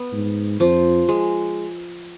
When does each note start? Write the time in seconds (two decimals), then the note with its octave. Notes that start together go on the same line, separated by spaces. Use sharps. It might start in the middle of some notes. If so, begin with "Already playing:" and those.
Already playing: B3
0.12 G#2
0.60 F2 F3
1.09 G#3